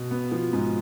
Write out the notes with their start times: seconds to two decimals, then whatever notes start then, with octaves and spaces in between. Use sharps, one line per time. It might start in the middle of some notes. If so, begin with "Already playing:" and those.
Already playing: B2
0.11 B3
0.32 F3
0.53 G#2